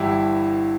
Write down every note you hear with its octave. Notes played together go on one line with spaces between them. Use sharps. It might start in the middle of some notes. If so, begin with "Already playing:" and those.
Already playing: G1 G2 E3 E4 G4